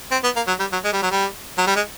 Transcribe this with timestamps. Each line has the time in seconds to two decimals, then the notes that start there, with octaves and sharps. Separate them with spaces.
0.11 C4
0.24 B3
0.36 A#3
0.47 F#3
0.60 G3
0.72 F#3
0.84 G#3
0.93 G3
1.02 F#3
1.11 G3
1.58 F#3
1.67 G3
1.76 G#3